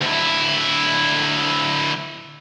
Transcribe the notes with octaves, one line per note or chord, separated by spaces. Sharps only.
D2 E4